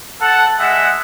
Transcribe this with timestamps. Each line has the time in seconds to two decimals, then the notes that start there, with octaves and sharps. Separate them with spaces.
0.21 A4 F#5 A5
0.59 G#3 E5 F#5